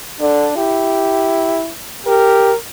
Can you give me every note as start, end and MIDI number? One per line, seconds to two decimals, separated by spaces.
0.20 0.48 50
0.20 0.54 62
0.56 1.70 64
0.56 1.61 67
2.06 2.52 67
2.06 2.56 70